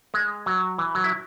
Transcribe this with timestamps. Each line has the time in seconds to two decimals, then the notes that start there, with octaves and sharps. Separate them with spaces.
0.14 G#3
0.46 F#3
0.78 E3
0.95 F#3
1.04 E4